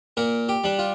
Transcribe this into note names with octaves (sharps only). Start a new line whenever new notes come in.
A#2 A#4
G4
G3 D4
F4